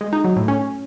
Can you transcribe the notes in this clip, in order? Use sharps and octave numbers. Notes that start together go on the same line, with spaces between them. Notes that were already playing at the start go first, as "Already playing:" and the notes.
G#3
D#4
F#3
A2
C#4